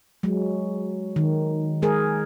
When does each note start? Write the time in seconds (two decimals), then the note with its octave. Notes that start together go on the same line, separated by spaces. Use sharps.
0.23 F#3 G#3
1.16 D#3
1.82 G#3 G#4 A#4